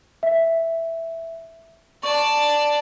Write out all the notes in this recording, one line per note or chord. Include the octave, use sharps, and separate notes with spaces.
E5
D5 A5 C#6